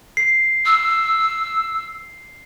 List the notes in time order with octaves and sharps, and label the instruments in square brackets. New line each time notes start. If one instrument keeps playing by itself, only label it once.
[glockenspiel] C7
[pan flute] E6